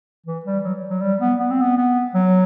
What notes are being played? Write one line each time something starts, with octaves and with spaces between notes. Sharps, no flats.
E3
G3
F#3
F#3
G3
B3
B3
C4
B3
B3
F#3